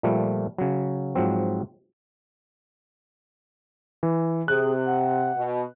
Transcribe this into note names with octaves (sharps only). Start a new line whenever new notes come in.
A#2 F3 G3 A3
C#3 F#3
G#2 F3 F#3 C4
E3
C3 G#4 F#6
F#5
B2